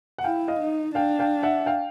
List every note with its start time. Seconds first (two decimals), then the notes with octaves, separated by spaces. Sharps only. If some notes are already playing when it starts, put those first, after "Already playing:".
0.18 F#5
0.24 E4 F5 G5
0.48 D#5 F5
0.60 D#4
0.95 D4 F5 G5
1.19 F5 G5
1.43 E5 F#5
1.66 F5 G5